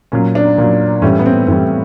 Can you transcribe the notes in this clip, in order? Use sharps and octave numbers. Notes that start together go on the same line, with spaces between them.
A#2 F#3 C#4
D4
A#2 F#3
A2 E3 G3 C#4
B3
C4
A2 E3 G3 C4